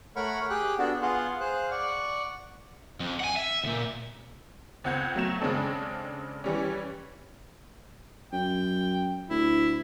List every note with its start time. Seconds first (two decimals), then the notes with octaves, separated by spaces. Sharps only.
0.16 A3 A#4 C#5 F#5 B5 C#6
0.50 G4 G#4 G5 F#6
0.78 B3 D4 F#4 A4
1.02 B3 F4 G#4 F5 F#5
1.40 G#4 C5 F5 F#6
1.71 D5 F#5 C#6
3.00 F2
3.20 F#5 G#5
3.36 E5
3.64 C#2 A#2
4.84 C#2 C4 F#5 G6 G#6
5.16 F#3 A3 E7
5.41 C#3 G#3 C4 D4 A4
6.44 E3 G3 C#4
8.33 F#2 G5
9.30 D2 E4